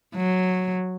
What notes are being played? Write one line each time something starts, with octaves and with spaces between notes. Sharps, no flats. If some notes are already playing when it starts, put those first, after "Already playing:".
F#3